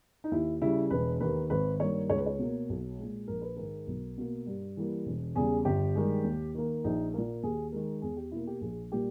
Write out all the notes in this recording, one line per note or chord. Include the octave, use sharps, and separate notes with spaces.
D#4
D#2 E4
C#3 G3 E4
E1 B4
D#2 D#3 A#3 B4
G#1 B4
G2 D#3 G3 A#3 C#5
C#2 C#5
B4
C#5
B2 A#3
B1
A#2 G#3
A#1 A#4
B4
G#2 D#3 G#3 A#4
B1
B2 A#3
G2
E3 G3 A#3
E1
E2 C#3 G3 G#4
G1 G4
G2 D#3 G#3
D#2
D#3 A#3
A#1 D#4
A#2 A#3
D#2 G#4
D#3 G#3 A#4
E2 G#4
G4
B2 A#3 E4
G4
A#1 G#4
A#2 G3 A#3 G4